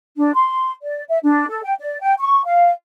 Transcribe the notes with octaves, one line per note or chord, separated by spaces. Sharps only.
D4
C6
D5
E5
D4
A4
G5
D5
G5
C#6
F5